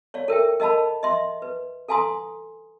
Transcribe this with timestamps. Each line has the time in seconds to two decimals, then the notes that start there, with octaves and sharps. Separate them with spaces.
0.14 C#5 D5 F5
0.28 A4 A#4 E5 G5
0.60 A#4 D#5 F5 A5 B5
1.03 D#5 E5 C6
1.42 B4
1.88 A4 F5 G#5 A#5 C6 D#6